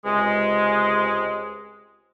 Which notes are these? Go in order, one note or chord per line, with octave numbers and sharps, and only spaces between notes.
C#2 C3 G#3